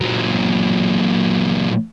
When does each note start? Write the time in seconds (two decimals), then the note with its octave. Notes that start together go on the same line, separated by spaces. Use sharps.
0.01 A#2 F#3